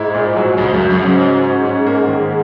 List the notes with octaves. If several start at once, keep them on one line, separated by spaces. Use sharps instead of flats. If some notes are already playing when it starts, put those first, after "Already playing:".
Already playing: G#2 E4
A#2
F#3
C#2 G#2
F#2
F#3
F#2
C#3
G#2
F#3
C#4
C#4
A#3
D#3